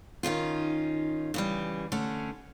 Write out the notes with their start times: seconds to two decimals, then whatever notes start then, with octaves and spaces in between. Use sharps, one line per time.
0.23 D#3 C#4 D#4 F4
1.34 C#3 E3 G3
1.92 D3 A3 C#4